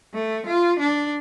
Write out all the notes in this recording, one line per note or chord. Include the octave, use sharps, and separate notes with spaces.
A3
F4
D4